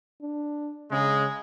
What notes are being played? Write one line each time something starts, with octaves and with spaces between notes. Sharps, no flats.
D4
C#3 G#3